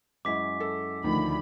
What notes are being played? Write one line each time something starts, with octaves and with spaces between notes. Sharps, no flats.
F#2 G#3 E4 D6 B6
A4
D2 D#3 F3 B5